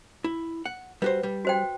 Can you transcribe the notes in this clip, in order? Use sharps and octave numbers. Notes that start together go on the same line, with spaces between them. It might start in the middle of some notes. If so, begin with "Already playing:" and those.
E4
F#5
G3 F#4 B4 C5
G3
F#4 C5 G5